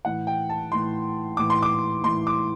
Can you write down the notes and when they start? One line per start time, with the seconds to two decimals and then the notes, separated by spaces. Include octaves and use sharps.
0.05 A2 E3 F#5
0.27 G5
0.49 A5
0.72 A2 E3 C6
1.37 A2 E3 D6
1.50 C6
1.63 D6
2.04 A2 E3 C6
2.27 D6